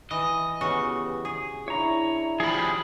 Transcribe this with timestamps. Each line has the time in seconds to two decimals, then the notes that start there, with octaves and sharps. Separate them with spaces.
0.11 E3 D#5
0.61 C#3 E3 B3 F#4 G4
1.25 G#4
1.68 D4 E4 C#5 A#5
2.40 F3 G3 G#4 B5